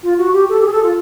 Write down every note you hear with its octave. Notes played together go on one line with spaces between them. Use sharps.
F4
F#4
G4
A4
G4
G#4
A4
F4